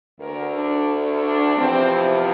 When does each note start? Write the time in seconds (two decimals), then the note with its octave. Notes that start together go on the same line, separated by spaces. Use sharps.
0.19 D2 D3 A3 A#4
0.54 D4
1.22 D4
1.56 E2 C3 F3 C4